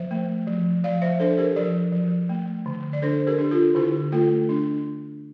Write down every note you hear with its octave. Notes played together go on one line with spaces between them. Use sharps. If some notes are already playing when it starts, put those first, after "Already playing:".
Already playing: F3 C5 E5
A3
F3
F3 D5 F5
C5 E5
D4 A4 C5
G4 A#4
F3 A#4 D5
F3
A3
D3
D5
D4 A4 C5
G4 A#4
D4
F4 A4
D3 E4 G4
A3 F4 A4
D4